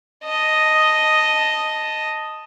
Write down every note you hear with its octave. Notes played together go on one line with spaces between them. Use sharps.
D#5 A5